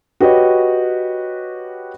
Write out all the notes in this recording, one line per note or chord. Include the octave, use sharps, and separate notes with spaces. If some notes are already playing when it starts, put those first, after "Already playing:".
F#4 G4 B4 C#5 D#5